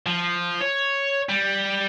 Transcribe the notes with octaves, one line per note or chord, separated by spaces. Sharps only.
F3
C#5
G3